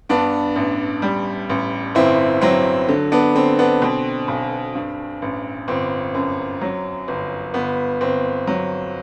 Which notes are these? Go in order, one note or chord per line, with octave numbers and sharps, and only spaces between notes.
G2 B3 D4
A1
G3
A1
G1 C4 E4
F#3 C4
D3
B3 D4
D3 C4
B3 D4
B2 C4
B1
G2
A1
G1 C4
F#2
F#3
G1
G1 B3
G1 C4
F#3